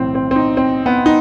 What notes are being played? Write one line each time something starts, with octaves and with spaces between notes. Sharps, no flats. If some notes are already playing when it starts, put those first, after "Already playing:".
Already playing: B1 A2 E3 C4
C4
C4
D#4
C4
B3
D#4